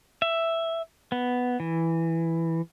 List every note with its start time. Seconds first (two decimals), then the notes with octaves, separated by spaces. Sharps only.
0.22 E5
1.12 B3
1.60 E3